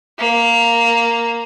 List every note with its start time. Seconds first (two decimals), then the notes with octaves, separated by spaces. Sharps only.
0.19 A#3